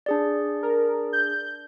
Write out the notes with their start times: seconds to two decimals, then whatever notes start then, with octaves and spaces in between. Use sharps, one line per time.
0.06 D4 G#4 D5
0.63 A#4
1.13 G6